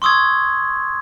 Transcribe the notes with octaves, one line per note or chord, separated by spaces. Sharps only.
C6 C#6 D#6 E6 G#6